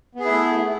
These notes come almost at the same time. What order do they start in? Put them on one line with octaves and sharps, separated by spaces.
B3 G#4 E4 A3